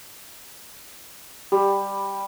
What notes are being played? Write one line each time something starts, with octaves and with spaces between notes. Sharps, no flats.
G3 G4